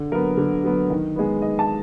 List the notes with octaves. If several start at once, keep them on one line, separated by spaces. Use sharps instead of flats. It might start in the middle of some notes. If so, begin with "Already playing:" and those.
Already playing: D3
F#3 B3 A#4
D3
F#3 B3
D#3
G#3 B3
D#3 D#5
A5